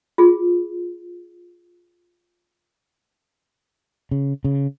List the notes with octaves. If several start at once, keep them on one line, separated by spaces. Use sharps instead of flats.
F4 G#4
C#3
C#3